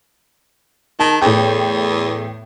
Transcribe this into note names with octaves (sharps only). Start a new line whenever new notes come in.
D#3 A5
E2 A2 G5